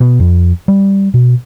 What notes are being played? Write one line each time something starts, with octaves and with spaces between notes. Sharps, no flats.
B2
F2
G3
B2